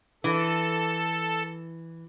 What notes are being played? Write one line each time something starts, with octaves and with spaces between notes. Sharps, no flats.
E3 A4